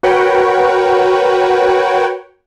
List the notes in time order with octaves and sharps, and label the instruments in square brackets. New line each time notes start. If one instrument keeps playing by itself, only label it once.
[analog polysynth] F#4 A#4 B4 C#5 F#5 G5